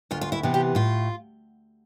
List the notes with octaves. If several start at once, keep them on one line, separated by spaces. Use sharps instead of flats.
D2 F4
F4
E4
C3 E3 B3
G4
A2 F4